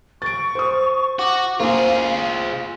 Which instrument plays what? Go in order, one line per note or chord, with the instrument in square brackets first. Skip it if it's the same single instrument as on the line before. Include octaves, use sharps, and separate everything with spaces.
[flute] C#6 [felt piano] A6 D7
[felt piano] C5 D#6
[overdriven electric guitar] F#4 [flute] D6
[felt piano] A#3 C4 [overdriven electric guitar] F4 G#4 [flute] F5